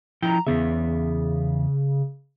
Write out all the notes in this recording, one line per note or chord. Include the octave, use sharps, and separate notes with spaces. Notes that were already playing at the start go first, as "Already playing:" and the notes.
F3 E4 G5 A#5
E2 C#3 B3 E5